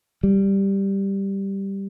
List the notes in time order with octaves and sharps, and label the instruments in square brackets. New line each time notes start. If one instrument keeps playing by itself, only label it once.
[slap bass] G3